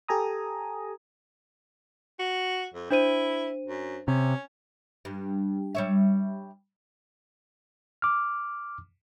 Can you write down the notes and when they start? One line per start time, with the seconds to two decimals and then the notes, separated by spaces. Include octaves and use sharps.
0.08 G4 A4 G#5 A#5 D#6
2.20 F#4
2.74 F2
2.91 D4 E4 C5 D#7
3.67 F#2
4.08 C3 C#4
5.05 G2
5.75 G3 C#5 E5
8.02 D6 F6